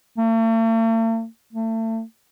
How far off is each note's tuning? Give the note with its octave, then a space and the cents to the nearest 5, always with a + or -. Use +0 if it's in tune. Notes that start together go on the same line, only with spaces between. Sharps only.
A3 +45
A3 +30